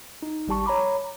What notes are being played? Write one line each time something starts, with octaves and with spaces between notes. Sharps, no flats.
D#4
G#1 G3 G4 A5 C#6
C#5 A#5 B5 D6